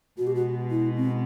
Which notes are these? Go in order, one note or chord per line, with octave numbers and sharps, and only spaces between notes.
B2 G#3 B3 F#4
G4
F#4
E4
C4